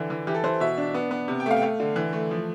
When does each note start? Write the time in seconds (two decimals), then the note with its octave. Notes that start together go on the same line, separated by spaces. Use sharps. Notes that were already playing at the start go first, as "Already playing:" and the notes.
Already playing: D3 E3
0.10 E3
0.27 E3 G4
0.35 A4
0.44 E3 C5
0.60 B2 E5
0.78 D4
0.94 B3
1.11 B3
1.28 C3
1.40 G5
1.46 A3 F5
1.56 G5
1.62 A3 F5
1.80 D3
1.96 E3
2.13 A3
2.31 F3